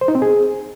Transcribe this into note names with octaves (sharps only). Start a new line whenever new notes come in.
C5
D#4
C4
G#4